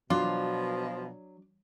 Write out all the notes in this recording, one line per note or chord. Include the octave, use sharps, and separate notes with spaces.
B2 F3 F#3 D4 F4